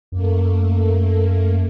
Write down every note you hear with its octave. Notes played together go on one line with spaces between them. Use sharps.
F#2 A3 A#3